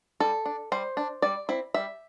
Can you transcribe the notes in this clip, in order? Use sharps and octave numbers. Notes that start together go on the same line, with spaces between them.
G3 A4
D4
G3 C5
D4
G3 D5
C4 E4
G3 E5